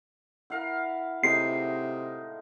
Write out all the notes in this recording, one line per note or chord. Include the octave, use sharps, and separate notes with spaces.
E4 A#4 F5 F#5
A2 C3 G#3 D#4 C7